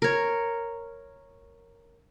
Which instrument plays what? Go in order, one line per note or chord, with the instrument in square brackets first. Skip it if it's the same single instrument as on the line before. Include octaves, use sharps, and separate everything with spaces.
[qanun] A#4 C#5